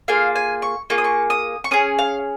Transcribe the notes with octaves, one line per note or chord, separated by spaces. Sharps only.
A#3 F4 G#4 F5
G#5
C#6
A#3 F4 G#4 C#6
D#6
C#6
D#6
C#6
C#4 G#4 D#6
F5